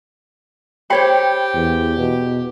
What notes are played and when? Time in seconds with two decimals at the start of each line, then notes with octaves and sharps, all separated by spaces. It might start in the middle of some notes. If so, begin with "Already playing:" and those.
0.90 G4 C5 C#5 G5 B5
1.54 E2
1.98 B2